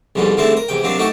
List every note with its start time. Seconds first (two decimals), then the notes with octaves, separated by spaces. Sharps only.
0.15 C2 F2 G#2 B2 G3
0.37 G#2 D3 G3 A3 C4 E4
0.57 A#4
0.68 E2 C3 G5
0.83 C3 F#3 A#3 C4 D4
0.98 A3 D#4 F#4 G4 A4